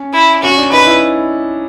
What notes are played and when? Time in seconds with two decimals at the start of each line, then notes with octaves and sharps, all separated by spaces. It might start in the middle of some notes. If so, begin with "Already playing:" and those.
Already playing: C#4
0.13 E4
0.43 C#4 F#4
0.57 D4
0.72 D#4 B4
0.86 E4